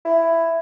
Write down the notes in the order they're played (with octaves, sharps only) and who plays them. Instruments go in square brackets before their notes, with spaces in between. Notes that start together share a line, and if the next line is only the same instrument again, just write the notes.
[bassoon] E4